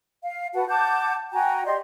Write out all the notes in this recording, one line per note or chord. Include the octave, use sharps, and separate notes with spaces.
F5
F#4 B4 F#5 A5
F#5 A5 D6 G6
F#4 G5 G#5 A#5
G4 D5 D#5 C6